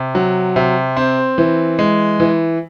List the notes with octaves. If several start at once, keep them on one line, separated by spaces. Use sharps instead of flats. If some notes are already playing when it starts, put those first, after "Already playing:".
Already playing: C3
F#3
C3
C4
E3
G#3
E3